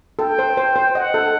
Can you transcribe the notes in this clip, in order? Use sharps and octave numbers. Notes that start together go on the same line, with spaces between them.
A4 G5
C5
C5
C5
D#5 F#5
A4